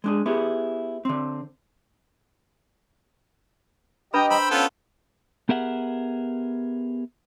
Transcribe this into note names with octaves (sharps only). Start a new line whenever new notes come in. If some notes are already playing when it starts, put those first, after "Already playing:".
G#3 D4 G#4
B3 E4 G4 G#4
D3 C4
D4 G4 B4 D#5 G5 A#5 B5 D#6
C5 G5 A#5 B5 E6
B3 C#4 F4 A4
B3 G4 G#4 A#4 E5 F#5